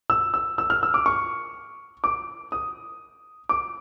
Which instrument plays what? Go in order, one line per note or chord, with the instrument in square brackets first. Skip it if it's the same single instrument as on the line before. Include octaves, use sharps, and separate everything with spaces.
[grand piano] E6
E6
E6
F6
E6
D6
C#6
D6
D#6
D6